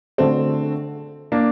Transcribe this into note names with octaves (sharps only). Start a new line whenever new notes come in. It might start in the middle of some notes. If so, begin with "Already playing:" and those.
D3 A3 C4 D4 F#4 A4
A#3 D4